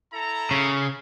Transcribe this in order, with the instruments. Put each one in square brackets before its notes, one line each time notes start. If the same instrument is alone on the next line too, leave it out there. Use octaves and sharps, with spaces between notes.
[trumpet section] E4 A4 A#5
[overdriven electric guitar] C#3